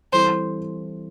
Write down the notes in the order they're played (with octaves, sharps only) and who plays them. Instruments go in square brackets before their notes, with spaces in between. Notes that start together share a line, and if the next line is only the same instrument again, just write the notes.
[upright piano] E3 G3 C4 E4 A4 [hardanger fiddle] C5